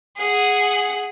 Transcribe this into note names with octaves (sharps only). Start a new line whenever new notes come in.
G#4 F#5